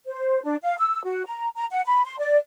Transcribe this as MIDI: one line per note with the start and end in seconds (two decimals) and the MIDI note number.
0.07 0.42 72
0.43 0.56 62
0.63 0.76 77
0.78 1.02 88
1.04 1.26 66
1.26 1.49 82
1.56 1.65 82
1.71 1.82 78
1.86 2.05 83
2.05 2.18 84
2.19 2.37 74